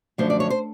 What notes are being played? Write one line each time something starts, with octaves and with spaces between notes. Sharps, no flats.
F#2 D3 F3 A3 C5
D5
C#5
C5